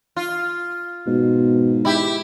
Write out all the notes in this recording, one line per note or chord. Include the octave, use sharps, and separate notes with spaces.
F4
G#2 B2
E4 G4